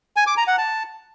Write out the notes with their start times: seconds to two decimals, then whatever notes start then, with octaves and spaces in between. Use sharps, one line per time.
0.17 G#5
0.27 D6
0.37 A#5
0.48 F#5
0.58 A5